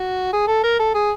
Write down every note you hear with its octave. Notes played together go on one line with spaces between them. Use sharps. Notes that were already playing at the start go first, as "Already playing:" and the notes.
Already playing: F#4
G#4
A4
A#4
A4
G#4